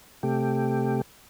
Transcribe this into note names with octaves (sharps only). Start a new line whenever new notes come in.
C3 A3 G4